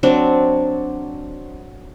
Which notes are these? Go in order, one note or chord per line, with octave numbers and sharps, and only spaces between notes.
F#3 C4 D4